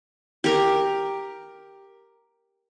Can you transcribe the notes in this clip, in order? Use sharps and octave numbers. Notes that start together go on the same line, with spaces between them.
G4 A#4